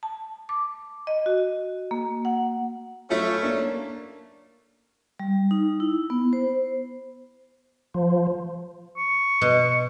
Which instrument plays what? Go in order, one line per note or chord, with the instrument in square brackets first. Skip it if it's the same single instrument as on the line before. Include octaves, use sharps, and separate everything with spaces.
[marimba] A5
D6
D#5
F#4
A#3
F#5
[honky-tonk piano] F#3 E4 F4 [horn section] A3 C#4
[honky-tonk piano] A#3 D4
[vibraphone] G3
D#4
E4
B3
C5
[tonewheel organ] F3
[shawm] C#6
[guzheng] B2 C6